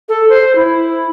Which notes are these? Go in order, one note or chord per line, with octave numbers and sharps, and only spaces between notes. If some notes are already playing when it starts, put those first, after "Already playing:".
A4
C5
E4